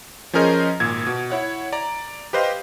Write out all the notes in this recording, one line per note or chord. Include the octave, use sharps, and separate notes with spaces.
F3 C#4 G#4 A#4 C5 D#5
G#1 A#2 G#6
B2
E4 C#5 F#5
D5 A#5
G4 B4 C5 D#5 F5